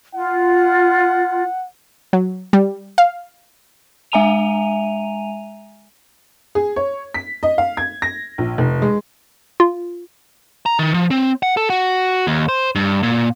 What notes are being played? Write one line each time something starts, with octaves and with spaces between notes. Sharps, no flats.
F4 F#5
F#3
G3
F5
G#3 E5 G#5 A#5 D#7 F7
G#4
C#5
B6
D#5
F5
G#6
A#6
A#1
F1
G#3
F4
A#5
D#3
F3
C4
F#5
A4
F#4
D#2
C5
G2
A#2